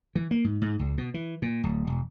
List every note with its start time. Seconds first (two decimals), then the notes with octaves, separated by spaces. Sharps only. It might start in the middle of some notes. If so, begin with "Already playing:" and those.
0.15 E3
0.31 A#3
0.44 G#2
0.62 G#2
0.79 C#2
0.98 B2
1.14 E3
1.42 A#2
1.63 D1
1.87 E1